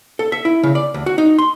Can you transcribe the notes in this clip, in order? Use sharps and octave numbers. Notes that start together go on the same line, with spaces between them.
A4
E5
E4
C#3
D5
D2
F#4
D#4
C6